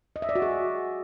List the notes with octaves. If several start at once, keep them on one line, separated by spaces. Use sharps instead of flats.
D#5
E5
D5
F#4
G#4